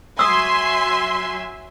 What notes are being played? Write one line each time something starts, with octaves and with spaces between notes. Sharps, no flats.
F#3 E5 G#5 C6 D#6 E6